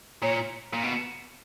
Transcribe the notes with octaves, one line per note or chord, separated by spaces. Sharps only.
A#2 C#5
A#2
B2